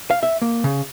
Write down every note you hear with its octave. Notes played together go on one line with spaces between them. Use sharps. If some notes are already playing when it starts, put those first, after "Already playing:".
F5
E5
A#3
C#3